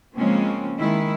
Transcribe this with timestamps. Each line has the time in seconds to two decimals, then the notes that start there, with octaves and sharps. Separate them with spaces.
0.16 C#3 F3 G#3 A#3 C4 C#4
0.79 D#3 G#3 E4